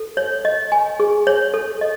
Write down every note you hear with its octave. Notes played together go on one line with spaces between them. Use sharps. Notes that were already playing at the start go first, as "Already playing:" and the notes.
Already playing: A4
C#5
D#5
G#5
G#4
C#5
A4
D#5